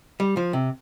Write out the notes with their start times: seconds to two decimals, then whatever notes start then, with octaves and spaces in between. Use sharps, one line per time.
0.20 G3
0.37 F3
0.53 C3